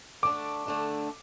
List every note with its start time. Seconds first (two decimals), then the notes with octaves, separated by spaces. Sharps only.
0.23 D3 A3 D4 D6
0.66 D3 A3 D4